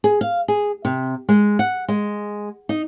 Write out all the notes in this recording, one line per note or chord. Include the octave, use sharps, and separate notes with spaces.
G#4
F5
G#4
C3
G#3
F#5
G#3
D#4